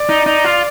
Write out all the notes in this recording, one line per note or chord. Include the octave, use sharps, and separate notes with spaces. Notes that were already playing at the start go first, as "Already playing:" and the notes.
Already playing: D5
D#4
D#4
F4